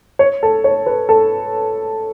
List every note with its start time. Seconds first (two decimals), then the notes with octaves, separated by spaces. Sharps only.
0.19 C#5
0.43 A4
0.64 C#5
0.86 B4
1.09 A4